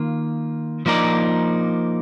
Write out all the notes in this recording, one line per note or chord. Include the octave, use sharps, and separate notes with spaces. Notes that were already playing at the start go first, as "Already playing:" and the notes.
Already playing: D#3 A#3 F4
F3 A#3 D#4 A#4 D5